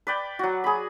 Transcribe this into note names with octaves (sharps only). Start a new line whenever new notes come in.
B4 D5 G5
F#3 F#4
G#4 B5